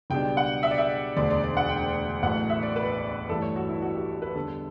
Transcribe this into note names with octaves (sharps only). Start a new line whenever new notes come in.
C#2 B2 G3 D4 G5
F#5
E5
D5
E5
E1 D2 D3 D5
D5
D5
F#5
G5
A1 A2 F#3 A3 F#5
E5
D5
B4
A1 G2 E3 A3 A4
C#5
F#4
E4
F#4
G4
B4
E2 D3 G3 B3 A4